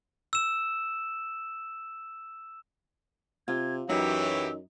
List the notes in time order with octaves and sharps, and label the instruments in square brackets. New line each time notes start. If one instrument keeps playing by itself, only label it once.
[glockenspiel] E6 E7
[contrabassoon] C3 [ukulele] F4 [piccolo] G#6
[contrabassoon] F#2 [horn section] E3 F#3 G4 [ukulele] D#4 [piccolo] E6